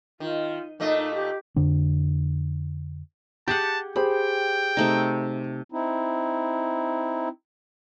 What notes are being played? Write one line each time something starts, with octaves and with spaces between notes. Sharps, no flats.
D#3 F4
A#2 A3 D#4 D#5
D#4
G4
F2 D3 D4
G4 G#4 F#5 A5 G6
G4 G#4 C5 G5 B5
C3 A3 D#4
C4 D#4 E4